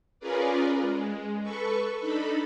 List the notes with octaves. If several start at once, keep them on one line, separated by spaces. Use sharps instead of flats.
C#4 F4 G#4 A#4 B4 D5
G#3
A4 B4 C#6
D4 D#4 A4 B5